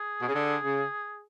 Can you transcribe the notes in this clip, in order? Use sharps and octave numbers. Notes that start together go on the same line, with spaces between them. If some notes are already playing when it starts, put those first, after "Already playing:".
Already playing: G#4
B2
C#3
D3
C#3